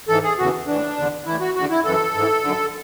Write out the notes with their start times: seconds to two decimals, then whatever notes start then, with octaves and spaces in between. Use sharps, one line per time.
0.08 G#2 E3 A4
0.23 G#4
0.38 E2 C#3 E3 F#4
0.67 A2 E3 D4
0.96 E2 D3
1.26 A2 E3 E4
1.40 F#4
1.55 E2 D3 F#4
1.70 E4
1.84 F#2 E3 A4
2.14 G#2 E3
2.42 F#2 D3